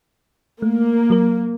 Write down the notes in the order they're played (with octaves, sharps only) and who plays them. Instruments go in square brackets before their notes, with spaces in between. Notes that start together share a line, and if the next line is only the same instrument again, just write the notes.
[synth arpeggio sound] A3 [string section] A#3
[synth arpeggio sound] F#3 A#4